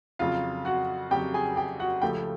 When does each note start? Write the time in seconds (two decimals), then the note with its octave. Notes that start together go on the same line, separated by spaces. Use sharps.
0.19 F2 C#3 F#3 F4 F5
0.65 F#4 F#5
1.11 F2 C#3 F#3 G4 G5
1.34 G#4 G#5
1.56 G4 G5
1.79 F#4 F#5
2.02 C#2 C#3 F3 A3 G4 G5